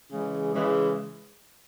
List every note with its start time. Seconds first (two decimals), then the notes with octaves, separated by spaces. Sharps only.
0.11 C#3 E3 G#3
0.53 C#3 E3 G#3